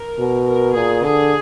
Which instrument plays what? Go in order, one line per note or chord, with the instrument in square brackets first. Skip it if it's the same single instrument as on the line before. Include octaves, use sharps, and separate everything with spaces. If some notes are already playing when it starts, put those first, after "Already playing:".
Already playing: [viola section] A#4
[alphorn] B2
[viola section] A#4
[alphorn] A#2 [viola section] G#4
[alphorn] D3 [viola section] G#4